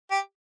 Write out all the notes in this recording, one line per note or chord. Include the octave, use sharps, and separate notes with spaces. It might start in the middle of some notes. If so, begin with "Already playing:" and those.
G4